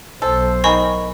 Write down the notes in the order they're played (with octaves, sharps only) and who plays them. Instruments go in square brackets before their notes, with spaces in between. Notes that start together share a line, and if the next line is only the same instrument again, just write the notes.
[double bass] B1 [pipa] A4 [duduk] C5
[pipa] D#3 G#5 [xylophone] D#5 B5 C#6